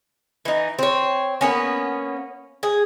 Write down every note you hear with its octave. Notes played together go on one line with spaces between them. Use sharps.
E3 D#4
C4 C#5
A#3 B3 C#4
G#4